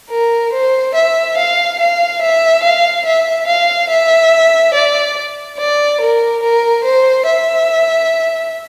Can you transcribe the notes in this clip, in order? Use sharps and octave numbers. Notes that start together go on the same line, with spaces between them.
A#4
C5
E5
F5
F5
E5
F5
E5
F5
E5
D5
D5
A#4
A#4
C5
E5